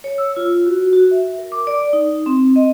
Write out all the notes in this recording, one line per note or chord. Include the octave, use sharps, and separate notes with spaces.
C#5
E6
F4
F#4
F#4
E5
A#4
D6
D5
D#4
C4
D#5